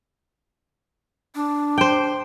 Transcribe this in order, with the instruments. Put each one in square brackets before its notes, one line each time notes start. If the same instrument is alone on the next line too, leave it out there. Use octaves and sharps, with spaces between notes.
[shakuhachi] D4
[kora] C5 G5